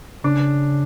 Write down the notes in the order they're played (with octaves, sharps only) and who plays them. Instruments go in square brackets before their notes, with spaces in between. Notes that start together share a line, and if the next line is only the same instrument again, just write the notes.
[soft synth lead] C#3 [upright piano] D4